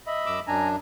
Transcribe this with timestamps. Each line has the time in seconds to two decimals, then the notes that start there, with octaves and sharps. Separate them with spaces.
0.07 D#5 E5 B5
0.26 F#2 D6 E6
0.47 F#2 D4 G#5 A#5